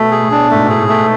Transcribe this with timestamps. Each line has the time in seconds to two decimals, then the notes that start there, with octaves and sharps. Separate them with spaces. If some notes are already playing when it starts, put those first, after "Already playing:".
Already playing: B2 A3
0.11 G#4
0.21 A2
0.31 D4
0.51 G#2 A3
0.70 G#4
0.80 A2
0.89 A3